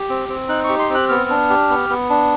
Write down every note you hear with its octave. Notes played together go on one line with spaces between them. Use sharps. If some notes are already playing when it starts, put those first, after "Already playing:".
Already playing: G4
C4
C4
D#4 F#6
G4 C#6
C6
C4
F#6
B3 F6
D4
G4
B3
B3
D4